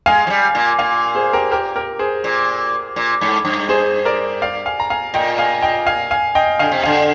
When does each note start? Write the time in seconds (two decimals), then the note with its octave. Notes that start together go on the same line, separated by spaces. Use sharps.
0.06 G#3 F5 G#5
0.27 F3
0.30 G3
0.55 A#2
0.79 A#2 F5 G#5
1.15 G#4 C5
1.33 G4 A#4
1.51 G4 A#4
1.76 G4 A#4
1.99 G#4 C5
2.24 A#2
2.96 A#2
3.21 G#2
3.45 G2
3.69 G#4 C5
4.05 A#4 D5
4.42 D5 F5
4.66 F5 G#5
4.80 A#5
4.90 F5 G#5
5.14 A#2 D#5 G5
5.38 F5 G#5
5.62 D#5 G5
5.87 F5 G#5
6.11 F5 G#5
6.35 D#5 G5
6.59 D3 F5 G#5
6.72 C3
6.83 D3 F5 G#5